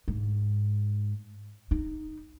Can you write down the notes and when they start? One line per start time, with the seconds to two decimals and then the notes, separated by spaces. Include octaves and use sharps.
0.08 G#2
1.71 D#4